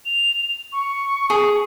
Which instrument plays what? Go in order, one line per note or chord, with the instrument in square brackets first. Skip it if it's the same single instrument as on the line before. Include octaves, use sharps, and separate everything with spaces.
[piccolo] F7
C#6
[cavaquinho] G#4